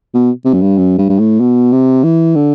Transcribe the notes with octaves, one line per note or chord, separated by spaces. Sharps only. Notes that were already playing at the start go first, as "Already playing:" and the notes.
B2
C3
F#2
G2
F#2
G2
G2
A2
B2
C3
E3
D3